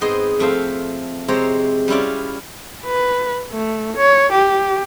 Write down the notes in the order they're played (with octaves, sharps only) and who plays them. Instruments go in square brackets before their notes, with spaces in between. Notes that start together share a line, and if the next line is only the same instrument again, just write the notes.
[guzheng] G#2 B3 C4 G#4 D#5 C6
F2 A3 C4 A4 C5 F5
C3 G#3 C4 C5 C#5 A#5
G3 C#4 E4 F4 D5
[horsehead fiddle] B4
A3
C#5
G4